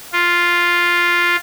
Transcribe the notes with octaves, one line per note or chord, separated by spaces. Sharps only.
F4